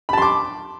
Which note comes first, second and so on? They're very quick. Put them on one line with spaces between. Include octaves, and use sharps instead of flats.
B5 A5 C6 D6